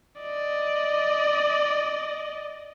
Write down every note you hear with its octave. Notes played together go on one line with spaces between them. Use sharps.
D5 D#5